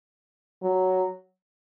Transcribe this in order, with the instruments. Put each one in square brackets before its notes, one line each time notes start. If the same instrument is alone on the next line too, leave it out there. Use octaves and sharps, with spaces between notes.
[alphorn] F#3